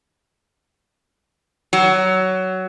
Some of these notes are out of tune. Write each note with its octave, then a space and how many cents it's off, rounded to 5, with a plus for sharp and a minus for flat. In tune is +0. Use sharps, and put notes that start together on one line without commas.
F#3 +15